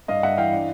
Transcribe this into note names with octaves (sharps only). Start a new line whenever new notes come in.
G2 D#5 F5
G2 E5 F#5
E3 F5 G5
D4